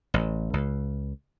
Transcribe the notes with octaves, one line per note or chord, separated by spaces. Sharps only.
A1
C#2